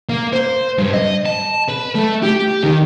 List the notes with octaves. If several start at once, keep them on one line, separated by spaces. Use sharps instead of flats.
A#3
C5
G2
D#5
A5
B4
A3
G4
D#3